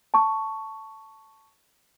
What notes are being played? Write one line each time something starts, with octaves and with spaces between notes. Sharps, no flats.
A5 C#6